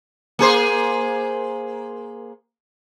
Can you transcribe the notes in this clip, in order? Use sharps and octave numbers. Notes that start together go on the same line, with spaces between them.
A#3 G#4 C5